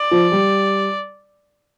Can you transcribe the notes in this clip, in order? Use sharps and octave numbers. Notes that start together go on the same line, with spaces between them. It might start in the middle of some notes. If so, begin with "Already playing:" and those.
Already playing: D5
F3
G3